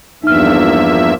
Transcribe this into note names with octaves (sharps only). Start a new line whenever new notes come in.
E2 G2 F3 A#3 D#4 E5 F6